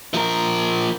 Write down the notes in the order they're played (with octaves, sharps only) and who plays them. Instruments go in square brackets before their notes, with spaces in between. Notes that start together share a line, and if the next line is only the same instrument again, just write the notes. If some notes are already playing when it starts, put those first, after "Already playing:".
[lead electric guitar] F3 A#4